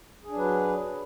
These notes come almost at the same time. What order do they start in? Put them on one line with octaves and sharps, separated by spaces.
G#4 D4 F#3 B4